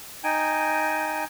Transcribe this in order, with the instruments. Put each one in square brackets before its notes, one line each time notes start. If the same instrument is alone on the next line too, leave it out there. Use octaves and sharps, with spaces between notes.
[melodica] D#4 G5 G#5